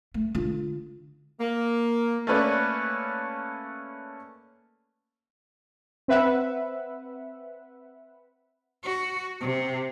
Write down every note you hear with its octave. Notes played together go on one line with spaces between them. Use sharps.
A3
D3 F4
A#3
A3 A#3 C#4 B4 D5
C4 B4 E5 F#5
F#4
C3